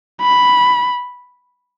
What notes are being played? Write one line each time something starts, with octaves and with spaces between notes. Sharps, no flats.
B5